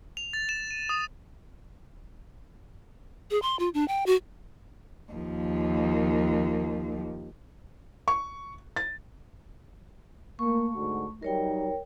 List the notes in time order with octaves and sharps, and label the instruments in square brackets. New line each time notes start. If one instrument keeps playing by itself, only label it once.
[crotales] F7
A6
E7
D#7
D#6
[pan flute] G#4
C6
F4
D4
G5
F#4
[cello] D#2 F3
[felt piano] C#6
A6
[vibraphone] A3 C#6 [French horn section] A#3
[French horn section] G#2 D3 F#4
[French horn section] F#3 G3 D#4 [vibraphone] A#4 C#5 G5